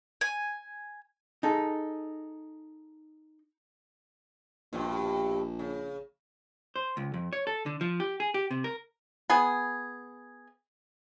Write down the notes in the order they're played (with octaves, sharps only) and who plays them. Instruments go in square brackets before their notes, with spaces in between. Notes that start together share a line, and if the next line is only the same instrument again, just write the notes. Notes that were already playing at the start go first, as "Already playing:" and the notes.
[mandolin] G#5
[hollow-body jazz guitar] D#4 G#4 A4
[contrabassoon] A#1 [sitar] G2 B2
[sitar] C#3
[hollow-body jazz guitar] C5
C#2
F2
C#5
A4
D3
F3
G4
G#4
G4
C3
A#4
[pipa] B3 G#4